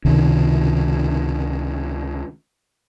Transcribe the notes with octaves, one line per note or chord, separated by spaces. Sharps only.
C#2 C3 D#3